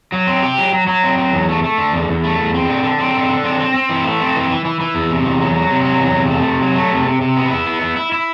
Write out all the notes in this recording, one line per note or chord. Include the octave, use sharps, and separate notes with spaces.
F#3
C4
G4
F#3
F#3
F#3
C4
F#3
E2
A3
A3
D3
E2
E2
A3
E2
C4
D3
D3
C4
D3
D3
C4
C4
C4
E3
A3
C4
E3
E3
E3
E3
E2
C3
E2
F#3
F#3
C3
F#3
E2
C3
A3
C3
F#3
A3
C3
C3
C3
B3
E4
B3
E4
E4
E4